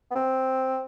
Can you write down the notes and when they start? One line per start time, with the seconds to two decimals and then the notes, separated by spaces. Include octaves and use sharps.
0.11 B3
0.15 C4